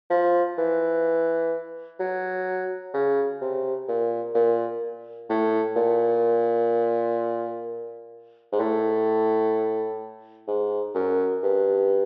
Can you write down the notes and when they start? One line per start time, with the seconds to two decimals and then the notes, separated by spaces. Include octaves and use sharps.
0.10 F3
0.58 E3
1.99 F#3
2.94 C#3
3.41 C3
3.88 A#2
4.34 A#2
5.30 A2
5.76 A#2
8.52 G#2
8.60 A2
10.48 G#2
10.95 F#2
11.43 G2